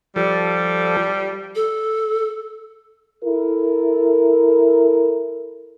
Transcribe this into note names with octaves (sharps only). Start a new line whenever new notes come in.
F3 G3 A4
A4
E4 A4 A#4